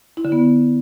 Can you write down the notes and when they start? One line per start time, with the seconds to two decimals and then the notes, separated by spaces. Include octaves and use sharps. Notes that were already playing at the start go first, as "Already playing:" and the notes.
0.17 E4
0.25 D3
0.32 B3